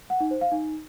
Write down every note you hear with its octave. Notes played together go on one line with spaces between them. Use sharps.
F#5
D#4
C5
F5
D#4